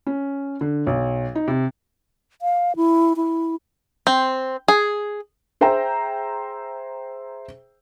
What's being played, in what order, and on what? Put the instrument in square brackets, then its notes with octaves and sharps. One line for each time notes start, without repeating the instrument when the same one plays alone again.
[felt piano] C#4
D3
B1
D#4
C3
[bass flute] F5
E4
E4
[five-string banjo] C4
G#4
[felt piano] G#4 C5 E5 G5 A#5